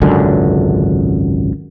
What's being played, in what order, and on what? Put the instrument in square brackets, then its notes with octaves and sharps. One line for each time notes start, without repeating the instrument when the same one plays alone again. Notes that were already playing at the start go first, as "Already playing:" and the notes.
[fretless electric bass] G#1 C#2 F#2 D3